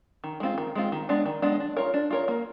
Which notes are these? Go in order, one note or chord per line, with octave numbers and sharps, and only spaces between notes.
D#3
G#3 C4 F4
D#3
G#3 C4 F4
D#3
G#3 B3 D4
D#3
G#3 B3 D4
D4
F4 A#4 C#5
D4
F4 A#4 C#5
A#3